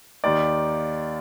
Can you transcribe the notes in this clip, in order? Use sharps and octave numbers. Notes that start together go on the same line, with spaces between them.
D#2 D#3 D5